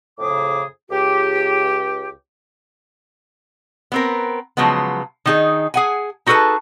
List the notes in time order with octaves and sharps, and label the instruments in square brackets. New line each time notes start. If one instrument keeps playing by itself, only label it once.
[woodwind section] F2 A2 C#3 G#4 D6
C#2 G4
[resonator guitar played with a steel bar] B3 C4 A#4
C#3 F3 F#3 G#3 B3
D#3 D#4 G#4
G#4 F#5 G#5
D#4 F#4 G#4 A4 B4 A5